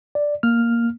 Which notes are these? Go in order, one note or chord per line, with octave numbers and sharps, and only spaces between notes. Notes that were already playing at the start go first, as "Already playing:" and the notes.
D5
A#3 F6